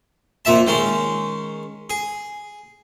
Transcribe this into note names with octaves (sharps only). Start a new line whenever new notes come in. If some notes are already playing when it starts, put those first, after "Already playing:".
F2 A#2 E5 A5
D#3 G#3 C#4
G#4